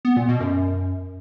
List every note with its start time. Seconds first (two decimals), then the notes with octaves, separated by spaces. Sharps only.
0.05 B3
0.17 A#2
0.29 B2
0.40 F#2